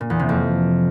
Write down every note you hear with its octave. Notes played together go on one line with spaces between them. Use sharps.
A#2
E2
C3
F2